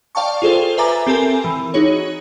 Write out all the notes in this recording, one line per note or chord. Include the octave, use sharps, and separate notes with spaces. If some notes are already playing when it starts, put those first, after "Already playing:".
D5 F5 G5 A5 C#6
F4 G#4 A4 C5
B4 E5 G#5 A#5 D6 A6
C4 G4 A4 A#4 G#5
E3
D#4 F#4 G#4 C#5